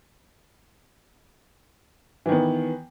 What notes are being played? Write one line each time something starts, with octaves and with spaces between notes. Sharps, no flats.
D#3 E3 B3